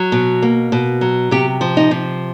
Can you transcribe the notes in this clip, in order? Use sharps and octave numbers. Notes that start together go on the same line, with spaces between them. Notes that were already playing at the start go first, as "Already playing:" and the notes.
Already playing: F#3
B2
A#3
B2
F#3
C3 G4
F3
D#4
C3